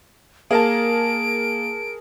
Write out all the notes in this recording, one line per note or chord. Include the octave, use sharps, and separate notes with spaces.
A#3 G#4 A#4 A5 D7